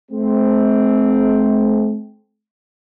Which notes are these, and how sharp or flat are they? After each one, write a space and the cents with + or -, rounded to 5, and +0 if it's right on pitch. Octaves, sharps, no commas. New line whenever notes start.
A3 -45 C4 +0